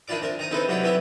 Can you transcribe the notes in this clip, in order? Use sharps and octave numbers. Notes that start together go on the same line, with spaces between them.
D#3 D4 E4 F4 D5 D6
C4 D4 A#4
D#3 A#5 D#6
C4 D#4 E4 A4 B4 C5
B1 C3 F#3 E4 C#5 D5
B3 C4 E4 G4 E5